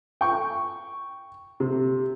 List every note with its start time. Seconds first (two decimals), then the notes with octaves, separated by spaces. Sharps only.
0.21 G5 C#6
1.60 C3